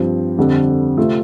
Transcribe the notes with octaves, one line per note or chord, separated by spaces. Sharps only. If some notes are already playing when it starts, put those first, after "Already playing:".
Already playing: G2 F3 C4
F2 D3 G3 C4
C3 A3 C4 F4